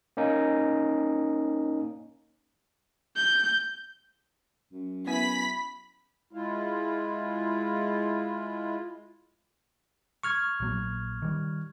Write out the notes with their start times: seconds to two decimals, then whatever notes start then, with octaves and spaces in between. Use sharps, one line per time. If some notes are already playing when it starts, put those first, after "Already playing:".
0.17 A#3 C#4 D#4
3.16 G6
4.72 F#2
5.07 B3 E4 G#5 B5 B6
6.33 G#3 E4 F4
10.23 C#6 F6 G#6
10.60 A#1 F#3 A#3
11.22 D#3 G3